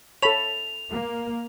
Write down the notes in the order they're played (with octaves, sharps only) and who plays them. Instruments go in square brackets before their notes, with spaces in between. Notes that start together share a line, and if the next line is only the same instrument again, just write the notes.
[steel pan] A4 A5 [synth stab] C#5 B5 [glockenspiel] F7
[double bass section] A#3